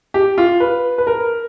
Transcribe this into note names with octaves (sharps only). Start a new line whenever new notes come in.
G4
F4
B4
B4
A#4